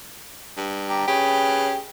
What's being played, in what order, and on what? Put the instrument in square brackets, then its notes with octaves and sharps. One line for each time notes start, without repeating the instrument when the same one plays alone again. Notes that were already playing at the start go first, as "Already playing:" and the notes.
[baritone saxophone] G2
[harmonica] G4 A#5
[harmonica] C#4 G#4 B4 [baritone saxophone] G4